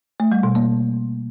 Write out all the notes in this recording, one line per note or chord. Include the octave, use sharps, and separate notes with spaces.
A3
G3
B2
A#3